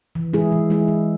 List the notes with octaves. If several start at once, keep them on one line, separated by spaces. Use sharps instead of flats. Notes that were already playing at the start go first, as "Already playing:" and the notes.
E3
G#3 E4 G#4
E3
G#3 E4 G#4
E3